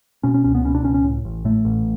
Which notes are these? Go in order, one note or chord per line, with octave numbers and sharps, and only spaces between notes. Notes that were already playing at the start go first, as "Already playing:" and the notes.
B2 C#4
C#4
C#2 C#4
B3
B2 C#4
D4
C#2 C#4
C#4
A2
A1
A2 A3
A1